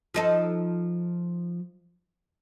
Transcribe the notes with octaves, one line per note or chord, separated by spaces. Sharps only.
F3 D#4 A4